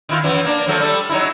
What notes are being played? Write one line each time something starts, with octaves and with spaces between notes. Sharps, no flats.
D#3 E4 F4
F#2 E3 B3
A#3 D4
F3 F#3 A3
G3 A4
F#3 D#4 E4